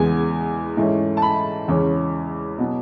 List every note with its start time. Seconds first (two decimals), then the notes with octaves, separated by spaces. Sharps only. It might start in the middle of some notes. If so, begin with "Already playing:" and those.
Already playing: E2 C#3 G#3 B3 G#5
0.77 G#2 E3 A3 C#4
1.17 A5
1.22 B5
1.68 E2 C#3 G#3 C#4
2.58 B2 F#3 B3